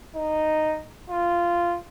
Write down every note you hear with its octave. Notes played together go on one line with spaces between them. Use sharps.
D#4
F4